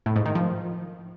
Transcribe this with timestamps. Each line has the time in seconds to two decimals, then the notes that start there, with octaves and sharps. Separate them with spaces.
0.06 A2
0.16 G#2
0.26 D#3
0.35 F3